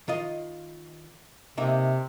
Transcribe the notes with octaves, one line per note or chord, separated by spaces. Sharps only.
D#3 F4 D#5
C3 A#3 D#4 E5